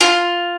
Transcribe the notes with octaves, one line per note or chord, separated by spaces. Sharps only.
F4